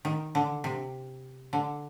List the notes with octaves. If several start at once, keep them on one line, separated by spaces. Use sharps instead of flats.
D#3
D3
C3
D3